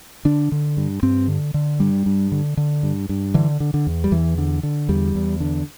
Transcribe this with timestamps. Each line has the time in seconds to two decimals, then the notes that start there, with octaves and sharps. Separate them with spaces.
0.25 D3 D4
0.52 D3
0.77 G2
1.03 G2 C4
1.28 D3
1.54 D3
1.80 G2 G3
2.06 G2
2.32 D3
2.57 D3
2.83 G2
3.09 G2
3.34 D3 E3
3.60 D3
3.74 D3
3.87 E2
4.04 G3
4.11 E2 E3
4.38 D3
4.63 D3
4.89 E2 G3
5.15 E2
5.40 D3